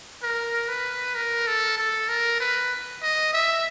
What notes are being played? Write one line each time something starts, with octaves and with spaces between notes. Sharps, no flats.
A#4
B4
A#4
A4
A4
A#4
B4
D#5
E5